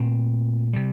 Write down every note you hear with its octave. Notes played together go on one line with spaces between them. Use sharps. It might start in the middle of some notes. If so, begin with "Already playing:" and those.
Already playing: A#2 A3 C4
C3 G3